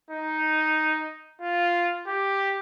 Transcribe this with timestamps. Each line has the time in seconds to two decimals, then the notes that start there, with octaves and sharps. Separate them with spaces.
0.10 D#4
1.41 F4
2.07 G4